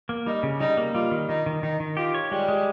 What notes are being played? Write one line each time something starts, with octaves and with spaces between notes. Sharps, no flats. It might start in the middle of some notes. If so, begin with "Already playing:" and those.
A#3
G3 D#4
C#3
G3 D#4
A#3
G3 F4
D#3
D#3 D#4
D#3
D#3 D#4
D#3
F4 G4
C#5
G3 G#3
G#3